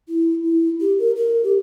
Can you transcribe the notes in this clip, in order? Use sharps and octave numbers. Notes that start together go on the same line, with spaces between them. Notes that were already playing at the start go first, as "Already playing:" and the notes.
E4
E4
G4
A#4
A#4
G4